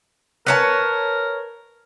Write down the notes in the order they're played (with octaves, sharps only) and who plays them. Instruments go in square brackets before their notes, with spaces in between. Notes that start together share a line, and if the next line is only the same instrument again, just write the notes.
[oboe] A#4 [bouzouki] B4 C#5 A5